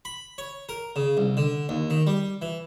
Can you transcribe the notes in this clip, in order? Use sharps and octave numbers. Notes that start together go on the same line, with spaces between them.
B5
C#5
A#4
C#3
C2
D3
D#2
D#3
G3
E3